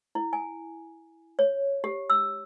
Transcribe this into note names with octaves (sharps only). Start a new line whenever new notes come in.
E4
G#5
C#5
G4
E6